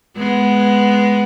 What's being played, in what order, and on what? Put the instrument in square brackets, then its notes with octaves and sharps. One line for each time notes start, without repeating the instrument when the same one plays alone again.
[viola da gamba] G#3 B3